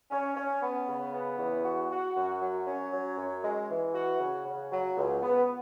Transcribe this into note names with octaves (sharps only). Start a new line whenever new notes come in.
C#4
C#4
B3
C#3
B3
E2
F#4
F#4
F#2
F#3
C#4
F#3
F#2
G#3
E3
F#4
C#3
C#3
F#3
C#2
B3